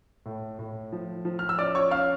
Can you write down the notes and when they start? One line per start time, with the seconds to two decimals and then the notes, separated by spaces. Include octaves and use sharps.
0.26 A2
0.59 A2
0.92 F3
1.25 F3
1.39 F6
1.49 E6
1.58 C#4 D5 D6
1.75 C#5 C#6
1.91 C#4 F5 F6